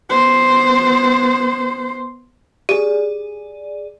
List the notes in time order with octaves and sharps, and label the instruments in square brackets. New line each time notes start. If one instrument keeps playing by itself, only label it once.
[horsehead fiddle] B3 C5
[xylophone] G4 [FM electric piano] G#4 D5